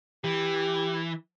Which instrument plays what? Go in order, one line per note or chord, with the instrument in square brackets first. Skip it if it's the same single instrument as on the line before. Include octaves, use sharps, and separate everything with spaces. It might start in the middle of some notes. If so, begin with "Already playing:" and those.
[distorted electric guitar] E3 [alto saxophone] G4